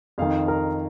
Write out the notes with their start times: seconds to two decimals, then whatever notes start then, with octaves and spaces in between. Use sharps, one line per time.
0.18 F2 D#3 F5
0.48 A#4